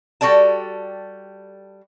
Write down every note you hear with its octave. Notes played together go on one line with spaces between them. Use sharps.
G3 F#4 A4 D5 A5